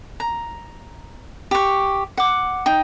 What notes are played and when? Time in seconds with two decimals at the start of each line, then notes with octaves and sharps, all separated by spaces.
0.20 A#5
1.51 G4 C#6
2.17 F#5 D6
2.66 D#4 G5